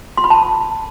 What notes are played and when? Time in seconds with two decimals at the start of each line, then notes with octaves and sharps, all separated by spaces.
0.17 C6
0.24 B5
0.30 A5